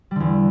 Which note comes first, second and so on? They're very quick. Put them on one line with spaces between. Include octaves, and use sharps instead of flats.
G3 D3 E2